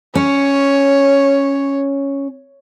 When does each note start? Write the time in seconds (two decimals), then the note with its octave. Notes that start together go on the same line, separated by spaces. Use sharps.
0.15 C#4 C#5